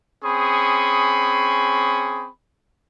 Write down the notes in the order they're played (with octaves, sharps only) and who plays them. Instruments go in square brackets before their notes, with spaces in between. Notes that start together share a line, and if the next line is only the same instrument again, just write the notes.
[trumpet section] C4 C#4 G#4 B5 C#6 D#6